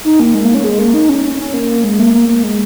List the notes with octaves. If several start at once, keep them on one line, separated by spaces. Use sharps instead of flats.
D#4
A#3
G#3
A#3
C#4
G#3
A#3
D#4
C#4
C#4
C#4
A#3
G#3
A#3
A#3
A#3
G#3